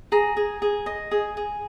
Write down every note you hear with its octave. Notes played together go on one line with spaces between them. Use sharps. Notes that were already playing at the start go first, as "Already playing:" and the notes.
G#4 A#5
G#4
G#4
D#5
G#4
G#4